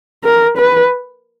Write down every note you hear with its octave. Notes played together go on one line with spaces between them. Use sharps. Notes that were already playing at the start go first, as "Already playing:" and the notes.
A#4
B4